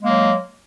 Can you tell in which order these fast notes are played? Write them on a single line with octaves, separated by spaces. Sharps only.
G#3 A#3 F#3